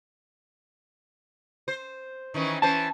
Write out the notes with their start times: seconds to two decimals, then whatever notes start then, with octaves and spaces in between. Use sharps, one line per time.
1.68 C5
2.34 D#3 E3 C#4
2.62 E3 C#4 C5 A5